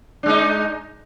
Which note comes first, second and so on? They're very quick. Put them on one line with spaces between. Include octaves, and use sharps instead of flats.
D4 G#3 D#4